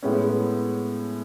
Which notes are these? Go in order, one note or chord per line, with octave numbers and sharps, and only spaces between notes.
A2 G#3 B3 C#4